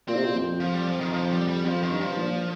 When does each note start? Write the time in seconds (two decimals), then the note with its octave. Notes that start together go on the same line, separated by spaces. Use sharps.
0.08 A#2 C4
0.16 C3
0.24 A#2
0.34 F2
0.60 F3
0.74 G3
0.87 F3
1.00 D#3
1.13 F3
1.30 G3
1.48 G3
1.65 F2 F3
1.83 D#3
1.91 G2
2.01 F3
2.10 G2
2.17 A#2